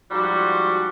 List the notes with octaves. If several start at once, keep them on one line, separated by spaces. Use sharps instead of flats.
G#2 F3 G3 F#4